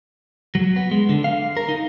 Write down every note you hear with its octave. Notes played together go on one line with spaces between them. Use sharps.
F#3
B3
G#3
D3
F5
A#4
D#4